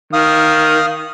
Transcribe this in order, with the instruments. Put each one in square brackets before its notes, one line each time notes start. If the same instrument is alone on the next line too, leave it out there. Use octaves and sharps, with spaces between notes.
[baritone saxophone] D#3 [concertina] F5 D#6